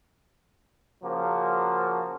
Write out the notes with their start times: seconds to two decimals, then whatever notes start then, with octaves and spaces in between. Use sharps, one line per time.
1.03 C#3 F3 A#3 F#4